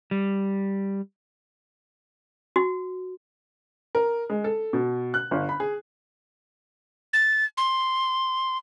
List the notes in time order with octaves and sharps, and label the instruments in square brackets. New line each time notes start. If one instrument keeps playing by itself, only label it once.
[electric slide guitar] G3
[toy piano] F#4
[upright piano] A#4
G#3
A4
B2
F#6
G1
B5
G#4
[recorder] A6
C6